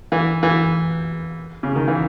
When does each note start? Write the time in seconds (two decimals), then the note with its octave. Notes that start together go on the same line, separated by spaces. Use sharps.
0.12 E3
0.43 E3
1.63 C#3
1.76 D#3
1.88 E3